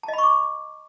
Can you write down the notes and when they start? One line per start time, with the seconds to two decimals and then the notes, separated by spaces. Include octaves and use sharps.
0.03 A5
0.08 D#5
0.13 B5
0.18 C#6
0.23 D6